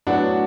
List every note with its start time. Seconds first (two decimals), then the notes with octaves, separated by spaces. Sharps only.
0.07 A2 F#3 B3 D4 F#4